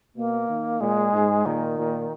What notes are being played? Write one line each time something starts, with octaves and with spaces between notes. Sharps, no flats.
B2 A#3
D#3
A#2 G#3
G#2
A#2 D#3
A#2